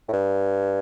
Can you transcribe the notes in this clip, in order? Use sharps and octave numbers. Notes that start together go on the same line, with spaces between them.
A2
G2